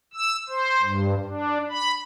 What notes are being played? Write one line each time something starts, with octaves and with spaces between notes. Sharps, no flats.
E6
C5
G2
D4
B5